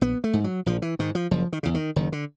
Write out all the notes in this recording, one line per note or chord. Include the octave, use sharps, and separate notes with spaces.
A#1 B3
A3
G#2
F#3
A#1 F3
E3
G#2 D#3
F3
F#1 F3
D#3
E2 C#3
D#3
F#1 D#3
D3